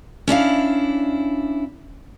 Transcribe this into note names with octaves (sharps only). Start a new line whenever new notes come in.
C#4 D4 E4 F5